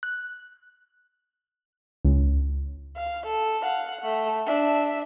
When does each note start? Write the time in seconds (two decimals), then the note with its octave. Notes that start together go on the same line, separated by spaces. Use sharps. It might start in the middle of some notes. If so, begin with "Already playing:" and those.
0.03 F#6
2.05 C#2
2.97 F5
3.27 A4
3.63 F5 F#5
4.02 A3
4.46 D4 E5